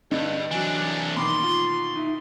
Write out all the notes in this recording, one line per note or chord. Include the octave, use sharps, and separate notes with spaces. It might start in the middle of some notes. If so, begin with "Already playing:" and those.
G2 D3 D#5
C2 E3 F#3 D4 F#4 G#5
B2 D#3 A#3 B5 C6 D6
F4
D#4 E4